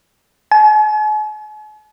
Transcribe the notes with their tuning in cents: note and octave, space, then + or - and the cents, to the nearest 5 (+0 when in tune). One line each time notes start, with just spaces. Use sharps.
G#5 +45